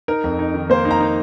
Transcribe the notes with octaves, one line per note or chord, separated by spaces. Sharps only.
D#4 A#4
F2
D#4
D#3
A#3 C5
D#4
A#5
D#4